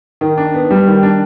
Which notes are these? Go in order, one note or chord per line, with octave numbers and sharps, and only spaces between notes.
D#3
D4
B3
G3
D#3
D4